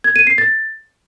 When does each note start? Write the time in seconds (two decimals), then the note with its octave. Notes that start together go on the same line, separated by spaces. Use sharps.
0.04 G#6
0.16 D#7
0.27 C7
0.38 A6